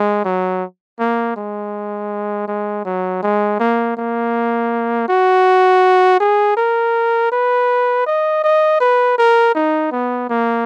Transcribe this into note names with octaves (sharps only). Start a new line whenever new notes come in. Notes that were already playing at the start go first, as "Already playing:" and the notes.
Already playing: G#3
F#3
A#3
G#3
G#3
F#3
G#3
A#3
A#3
F#4
G#4
A#4
B4
D#5
D#5
B4
A#4
D#4
B3
A#3